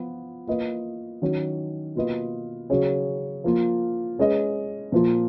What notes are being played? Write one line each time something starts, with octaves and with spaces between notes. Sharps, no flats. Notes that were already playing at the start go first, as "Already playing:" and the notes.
Already playing: F3 B3 F4 B4
A#3 F4 B4 D#5
D#3 F#3 C#4
B2 A#3 F4 B4 D#5
C#3 F#3 C#4 G#4 C#5
F3 A#3 F4
G#3 C#4 G#4 B4 D#5
A#2 F3 A#3 F4